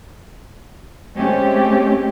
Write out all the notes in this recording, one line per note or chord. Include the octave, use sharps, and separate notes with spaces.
G#3 A3 C4 C#4 G4